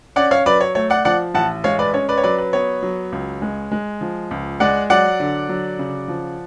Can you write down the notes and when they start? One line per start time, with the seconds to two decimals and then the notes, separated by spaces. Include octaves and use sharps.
0.16 C#4 D5 F#5
0.31 C#5 F5
0.46 F#3 B4 D5
0.61 C#5
0.75 A3 C#5
0.90 D5 F#5
1.05 F3 D5 F#5
1.34 A1 F#5 A5
1.64 G#3 C#5 F5
1.79 B4 D5
1.94 C#4 C#5
2.09 B4 D5
2.18 C#5
2.24 F#3 B4 D5
2.38 B4
2.53 B3 C#5
2.82 F#3
3.12 C#2
3.42 G#3
3.71 G#3
4.01 F3
4.31 C#2
4.60 G#3 D5 F#5
4.90 F#3 D5 F#5
5.20 D3
5.49 F#3
5.79 C#3
6.08 F3